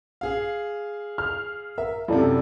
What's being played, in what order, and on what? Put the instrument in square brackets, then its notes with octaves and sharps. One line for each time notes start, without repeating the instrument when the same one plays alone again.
[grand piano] G#4 F5
[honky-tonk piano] F6
[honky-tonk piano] A#4 [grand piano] E5
[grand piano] F#2 C3 [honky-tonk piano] E4 A4 D5